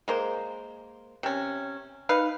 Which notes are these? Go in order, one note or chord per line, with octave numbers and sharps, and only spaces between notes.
G#3 A#3 C5
C3 C#4
D#4 B4 F5